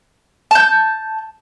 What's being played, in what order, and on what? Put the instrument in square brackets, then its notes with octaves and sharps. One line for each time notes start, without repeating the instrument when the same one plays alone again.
[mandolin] A5 G6